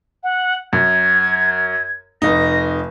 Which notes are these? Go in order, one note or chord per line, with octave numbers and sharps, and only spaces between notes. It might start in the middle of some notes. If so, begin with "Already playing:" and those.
F#5
F#2 G#6
F1 D#4 A#6